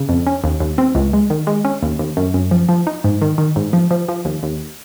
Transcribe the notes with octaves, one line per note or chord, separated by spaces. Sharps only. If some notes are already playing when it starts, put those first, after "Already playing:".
Already playing: C#3
F2
C#4
D#2
D#2
C4
C#2
G#3
D#3
G#3
C#4
D#2
D#2
F#2
F#2
F3
F3
D#4
G#2
D#3
D#3
G#2
F3
F3
F3
D#2
D#2